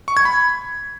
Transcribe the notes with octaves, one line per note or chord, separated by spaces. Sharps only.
C#6
G#6
B5